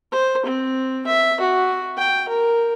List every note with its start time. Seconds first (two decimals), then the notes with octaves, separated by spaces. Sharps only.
0.12 C5
0.46 C4
1.07 E5
1.41 F#4
1.98 G5
2.28 A#4